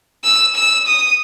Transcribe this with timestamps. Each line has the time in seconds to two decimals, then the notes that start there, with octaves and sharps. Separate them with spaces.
0.24 E6
0.55 E6
0.87 D#6